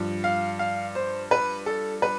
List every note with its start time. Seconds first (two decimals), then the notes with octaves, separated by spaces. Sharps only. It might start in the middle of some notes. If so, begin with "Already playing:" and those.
Already playing: G2 F3
0.24 F5
0.59 F5
0.95 C5
1.31 B4
1.66 A4
2.02 B4